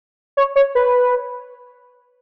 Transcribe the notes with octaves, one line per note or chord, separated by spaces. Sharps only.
C#5
C#5
B4